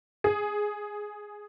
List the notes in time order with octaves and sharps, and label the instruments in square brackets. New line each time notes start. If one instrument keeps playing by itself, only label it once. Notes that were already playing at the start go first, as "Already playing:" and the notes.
[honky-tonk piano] G#4